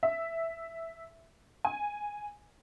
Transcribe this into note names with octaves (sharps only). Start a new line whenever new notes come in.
E5
G#5